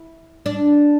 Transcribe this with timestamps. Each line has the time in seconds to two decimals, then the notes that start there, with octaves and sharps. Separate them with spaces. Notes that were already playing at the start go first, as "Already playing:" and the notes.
Already playing: E4
0.46 D4